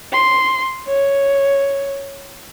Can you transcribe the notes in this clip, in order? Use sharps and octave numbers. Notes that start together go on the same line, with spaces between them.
C6
C#5